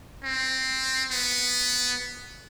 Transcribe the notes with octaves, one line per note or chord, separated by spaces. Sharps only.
C4
B3